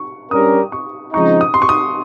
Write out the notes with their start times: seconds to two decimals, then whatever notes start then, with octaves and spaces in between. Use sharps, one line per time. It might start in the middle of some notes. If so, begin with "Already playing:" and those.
Already playing: C#6
0.31 G2 G3 C#4 G4 A#4 D#6
0.72 C#6
1.13 C#3 F3 G#3 C4 D#4 C#6
1.41 D#6
1.54 C6
1.62 C#6
1.69 D#6